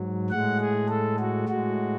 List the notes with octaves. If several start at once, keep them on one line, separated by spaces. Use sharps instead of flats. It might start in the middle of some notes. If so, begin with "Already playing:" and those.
Already playing: G#2 F#3
A2 G#3 F#5
G#4
A4
F#4
A2 G#3 F#4